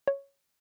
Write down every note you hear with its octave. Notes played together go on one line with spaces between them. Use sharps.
C#5